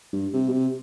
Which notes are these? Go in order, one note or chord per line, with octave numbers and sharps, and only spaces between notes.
G2
C3
B2
C3